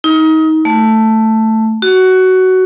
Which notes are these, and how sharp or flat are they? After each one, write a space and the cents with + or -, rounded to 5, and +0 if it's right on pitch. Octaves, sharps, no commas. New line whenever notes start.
D#4 +30
A3 +5
F#4 +15